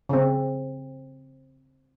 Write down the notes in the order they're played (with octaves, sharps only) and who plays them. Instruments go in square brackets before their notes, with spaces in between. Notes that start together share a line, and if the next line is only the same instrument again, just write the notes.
[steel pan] C#3 C4